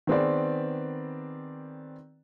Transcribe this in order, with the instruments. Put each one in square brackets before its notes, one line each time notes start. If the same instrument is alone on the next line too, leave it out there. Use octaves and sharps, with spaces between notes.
[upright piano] D#3 B3 C4 G#4 B4 D5